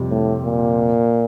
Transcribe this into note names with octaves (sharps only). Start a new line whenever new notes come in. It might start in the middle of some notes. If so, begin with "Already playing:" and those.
Already playing: F2 C3 G3
A2
A#2